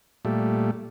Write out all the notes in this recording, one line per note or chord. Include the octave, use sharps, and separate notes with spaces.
A#2 G3 A3